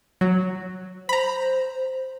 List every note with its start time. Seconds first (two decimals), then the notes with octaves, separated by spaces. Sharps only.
0.21 F#3
1.09 C5 A#5 B5